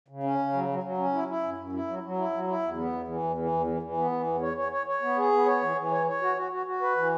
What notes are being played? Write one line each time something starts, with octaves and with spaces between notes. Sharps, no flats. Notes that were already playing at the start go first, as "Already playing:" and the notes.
C#3
C#4
C#3
F#3
F#3
F#3
C#4
E4
E4
F#2
F#2
E4
F#3
F#3
E4
F#3
E4
E2
B3
E2
E3
E2
E3
E2
E3
E3
B3
E3
E2
C#5
C#5
C#5
C#5
B3
G#4
B3
C#5
E3
E3
C#5
C#5
F#4
F#4
F#4
F#4
B4
E3